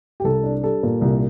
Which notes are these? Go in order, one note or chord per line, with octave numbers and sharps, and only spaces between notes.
G4
C2 A4
D4
G3 A4
A#2
C2